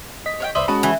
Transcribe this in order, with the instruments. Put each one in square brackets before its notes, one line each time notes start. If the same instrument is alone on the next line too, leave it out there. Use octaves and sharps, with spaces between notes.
[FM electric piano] D#5 B6
[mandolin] C#5 F5 G5
[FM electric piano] C2 D5 D#6 [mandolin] B4 C5 E5
[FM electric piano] G#3 C#4 D#6 [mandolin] F#4 A5 B5
[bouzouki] E3